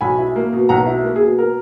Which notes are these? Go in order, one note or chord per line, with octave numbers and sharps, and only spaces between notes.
B1 G#5 B5
E4
A#3
B2
B1 F#5 A#5
E4
A#3
G#4
B2
A#4